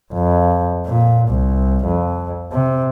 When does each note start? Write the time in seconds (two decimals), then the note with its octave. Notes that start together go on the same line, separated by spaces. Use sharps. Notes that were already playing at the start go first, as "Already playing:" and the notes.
0.14 F2
0.86 A#2
1.28 C2
1.85 F2
2.52 C3